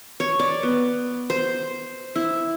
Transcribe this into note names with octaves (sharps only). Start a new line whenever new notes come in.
C#5
D5
B3
C5
E4